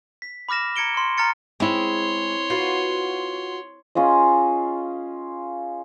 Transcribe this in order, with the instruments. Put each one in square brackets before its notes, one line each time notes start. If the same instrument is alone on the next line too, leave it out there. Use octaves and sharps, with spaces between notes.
[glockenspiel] B6
B5 D6 F6 A#6 E7
A#5 G#6 C#7 D7 G7
C6 C#6
A#5 F6 A6 C#7
[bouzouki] G#3 [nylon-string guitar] C4 E4 [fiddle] C#5 C6
[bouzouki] F4 F#4 B4
[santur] C#4 F4 G#4 D#5